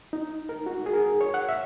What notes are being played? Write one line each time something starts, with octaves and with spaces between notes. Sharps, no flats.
D#4
A#4
F#4
G#4
A#4
C#5
F#5
E5